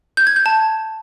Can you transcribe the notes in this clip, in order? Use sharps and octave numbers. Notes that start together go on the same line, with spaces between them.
G6
G#6
G6
A5